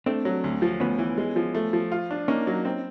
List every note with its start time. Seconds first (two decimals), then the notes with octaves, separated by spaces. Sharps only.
0.06 A3 C4 D4
0.25 F#3
0.44 D2
0.62 F3
0.80 D2 B3 C#4
0.99 E3
1.18 G#3
1.36 F3
1.55 A3
1.73 F3
1.92 F4
2.11 D4
2.28 A#3 C#4 D#4
2.47 F#3
2.65 C4